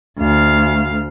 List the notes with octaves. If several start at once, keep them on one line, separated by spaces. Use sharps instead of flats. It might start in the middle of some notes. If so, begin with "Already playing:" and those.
D2 F5